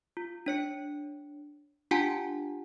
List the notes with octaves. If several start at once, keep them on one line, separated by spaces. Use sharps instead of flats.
F4
D4 C#5 C#7
D4 F4 G4 F#5 G#5 A5